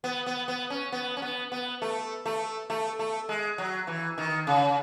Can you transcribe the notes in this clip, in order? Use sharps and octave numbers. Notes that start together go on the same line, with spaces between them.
B3
B3
B3
C#4
B3
C#4
B3
B3
A3
A3
A3
A3
G#3
F#3
E3
D#3
C#3